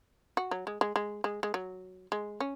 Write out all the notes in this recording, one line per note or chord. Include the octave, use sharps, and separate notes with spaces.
F#4
F#3
G#3
G#3
G#3
G#3
G#3
F#3
G#3
C#4